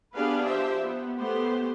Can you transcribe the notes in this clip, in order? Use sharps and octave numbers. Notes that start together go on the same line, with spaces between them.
B3 D4 G4 G#4 B4 F5
F3 G4 C5 E5
B3
A3 B3 G4 C5